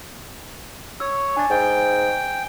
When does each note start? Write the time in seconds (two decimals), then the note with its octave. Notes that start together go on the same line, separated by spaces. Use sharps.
1.00 C#5 E6
1.37 D4 G#5 A6
1.50 G#2 G5